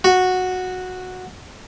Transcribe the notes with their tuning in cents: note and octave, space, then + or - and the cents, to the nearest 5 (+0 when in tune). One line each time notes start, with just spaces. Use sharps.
F#4 -10